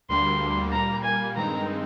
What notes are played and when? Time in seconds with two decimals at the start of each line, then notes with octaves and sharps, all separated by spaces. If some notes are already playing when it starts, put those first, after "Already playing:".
0.09 D2 D3 G3 A#3 D4 C6
0.72 A#2 G3 A#3 A#5
1.04 G#5
1.37 G2 D#3 G#3 C4 D#4 A#5